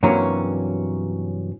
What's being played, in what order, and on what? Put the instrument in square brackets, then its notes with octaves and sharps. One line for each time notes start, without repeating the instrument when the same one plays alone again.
[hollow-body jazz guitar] G2 C3 E3 F#3 A#3 C#4